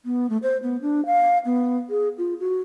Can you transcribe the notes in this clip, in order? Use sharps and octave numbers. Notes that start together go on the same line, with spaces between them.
B3
A3
C5
B3
D4
F5
B3
G#4
F4
F#4